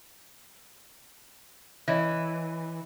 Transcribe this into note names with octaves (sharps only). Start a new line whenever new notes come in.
E3 C#5 D#5 E5